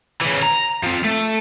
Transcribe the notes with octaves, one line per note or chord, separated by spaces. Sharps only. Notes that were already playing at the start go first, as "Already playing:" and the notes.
C#3 E3
A#5
F3 C4
A3